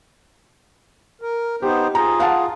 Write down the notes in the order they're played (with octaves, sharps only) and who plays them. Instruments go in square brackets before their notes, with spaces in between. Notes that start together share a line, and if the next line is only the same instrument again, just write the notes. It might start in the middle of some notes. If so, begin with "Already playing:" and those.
[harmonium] A#4
[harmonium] B3 D#4 C5 [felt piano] G4
[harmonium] F4 G#4 [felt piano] A#5
[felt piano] F5 F#5 A5